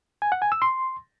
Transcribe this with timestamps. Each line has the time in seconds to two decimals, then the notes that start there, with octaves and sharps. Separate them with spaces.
0.22 G#5
0.32 F#5
0.42 G#5
0.52 E6
0.62 C6